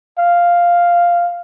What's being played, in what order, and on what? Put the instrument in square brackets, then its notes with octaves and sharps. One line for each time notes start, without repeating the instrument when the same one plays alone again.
[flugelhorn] F5